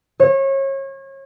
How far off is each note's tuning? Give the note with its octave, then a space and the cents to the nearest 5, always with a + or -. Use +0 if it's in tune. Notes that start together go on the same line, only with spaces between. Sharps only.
C#5 -30